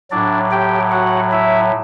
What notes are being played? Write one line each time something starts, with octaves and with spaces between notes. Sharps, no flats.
A2 F#3 D4 D5
G4 G5
F#4 F#5
E4 E5